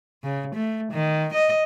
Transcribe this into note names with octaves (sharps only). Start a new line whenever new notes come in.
C#3
A3
D#3
D#5